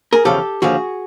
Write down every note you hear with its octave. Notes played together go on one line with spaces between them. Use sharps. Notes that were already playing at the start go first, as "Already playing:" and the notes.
G#4 A#4
E2 C#3 F3 G4 A4
D#2 D3 F3 F#4 G#4